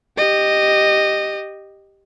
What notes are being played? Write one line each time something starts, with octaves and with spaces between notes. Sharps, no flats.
G4 D#5